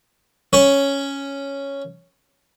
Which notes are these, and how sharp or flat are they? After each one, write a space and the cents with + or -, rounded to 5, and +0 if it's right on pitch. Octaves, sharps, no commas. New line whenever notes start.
C#4 +0 C#5 +0